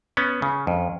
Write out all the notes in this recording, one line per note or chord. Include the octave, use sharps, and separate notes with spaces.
B3 C#4
C#3
F2